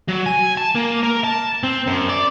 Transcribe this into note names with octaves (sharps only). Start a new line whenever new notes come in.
F#3
G#5
A5
A#3
A#4
A5
C4
F#2
D5